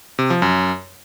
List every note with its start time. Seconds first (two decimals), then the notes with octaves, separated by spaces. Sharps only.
0.19 C3
0.30 F3
0.42 F#2